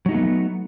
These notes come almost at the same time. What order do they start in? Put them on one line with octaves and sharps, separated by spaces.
F#3 D#4 A3 B3